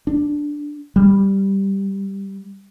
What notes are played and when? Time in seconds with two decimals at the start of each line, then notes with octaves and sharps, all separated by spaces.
0.07 D4
0.96 G3